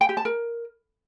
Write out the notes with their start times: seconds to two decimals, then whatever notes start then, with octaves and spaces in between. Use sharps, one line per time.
0.01 G5
0.09 G4
0.17 A5
0.25 A#4